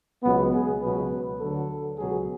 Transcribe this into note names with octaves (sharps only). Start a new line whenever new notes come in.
C#2 B2 F#3 B3
G#4
C#2 B2 F#3 B4
D2 D3 F#3 A4
C#2 B2 F#3 G#4